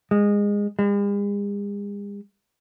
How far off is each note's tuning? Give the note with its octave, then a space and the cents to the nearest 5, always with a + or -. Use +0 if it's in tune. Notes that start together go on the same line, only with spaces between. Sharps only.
G#3 -20
G#3 -45